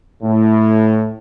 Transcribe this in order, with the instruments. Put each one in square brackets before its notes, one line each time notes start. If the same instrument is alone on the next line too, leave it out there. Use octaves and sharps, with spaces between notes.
[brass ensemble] A2